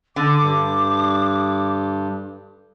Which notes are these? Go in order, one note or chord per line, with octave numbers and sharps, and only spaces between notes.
D3 D6
G2